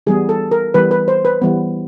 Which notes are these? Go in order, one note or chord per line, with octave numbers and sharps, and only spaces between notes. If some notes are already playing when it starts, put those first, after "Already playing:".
E3 G3 B3 G#4
A4
A#4
E3 G3 B3 B4
B4
C5
B4
E3 G3 B3